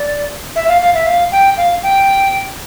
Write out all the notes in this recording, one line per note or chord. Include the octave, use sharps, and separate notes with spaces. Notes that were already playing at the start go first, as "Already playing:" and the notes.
Already playing: D5
E5
F5
F5
E5
F5
G5
F5
G5